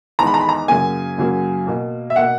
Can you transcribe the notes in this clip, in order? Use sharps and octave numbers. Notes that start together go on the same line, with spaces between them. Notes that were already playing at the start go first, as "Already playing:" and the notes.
E2 D#3 G#3 B3 A#5
B5
A#5
B5
A#5
F#2 C#3 F#3 A#3 G#5
F#2 C#3 F#3 A#3
B2 A#3
E5
B2 A#3 F#5